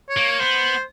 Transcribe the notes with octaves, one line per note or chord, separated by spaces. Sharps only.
C#5
A#3
B3 C5